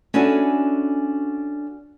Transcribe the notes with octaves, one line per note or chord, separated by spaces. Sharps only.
C#4 D4 E4 F#4 A4 G#5